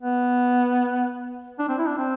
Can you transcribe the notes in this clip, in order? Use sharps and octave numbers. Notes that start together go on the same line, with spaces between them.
B3
D4
C4
E4
D4
C4